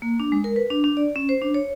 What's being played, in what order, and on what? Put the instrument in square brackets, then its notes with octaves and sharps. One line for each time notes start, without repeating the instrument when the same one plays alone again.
[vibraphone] A#3
D4
G#3
A#4
B4
D4
D4
D5
C#4
C5
D4
C#5